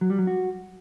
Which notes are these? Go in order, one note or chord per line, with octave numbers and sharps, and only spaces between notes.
F#3
G3
F#3
F#4